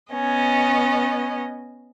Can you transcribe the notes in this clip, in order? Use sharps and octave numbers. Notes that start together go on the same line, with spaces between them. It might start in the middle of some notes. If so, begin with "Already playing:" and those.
B3 C#4 D#5